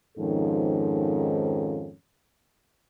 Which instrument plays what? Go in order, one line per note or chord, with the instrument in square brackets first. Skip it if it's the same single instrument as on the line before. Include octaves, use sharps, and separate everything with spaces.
[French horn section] F2 G#2 D#3 F3 C#4 A4